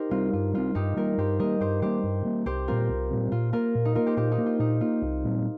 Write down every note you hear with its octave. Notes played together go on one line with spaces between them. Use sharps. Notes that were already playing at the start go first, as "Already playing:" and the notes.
Already playing: D#4 G4 A#4 C5
G3 C4 F4
G2 F4
G3 C4 F4
G2 D#4 G4
G3 A#3 F4 A#4
G2 G4 C5
G3 A#3 A#4 D#5
G2 G4 C5
G3 A#3 G4 C5
G2
G3 A#3
C2 G4 C5
A#2 G3 C4 F4 A#4
C2
A#2 G3 C4
A#2 F4
A#3 F4 A#4
A#2
D#4
A#3 F4 A#4
G4 C5
A#2 G4 C5
D#4 G4
A#3
F4
A#2 D#4
A#3 F4
C2
A#2 G3 C4